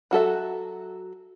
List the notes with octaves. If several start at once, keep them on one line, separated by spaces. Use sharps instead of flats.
F#3 F#4 A4 E5